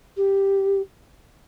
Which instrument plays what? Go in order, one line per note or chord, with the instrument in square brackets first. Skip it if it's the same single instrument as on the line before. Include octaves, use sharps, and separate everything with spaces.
[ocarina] G4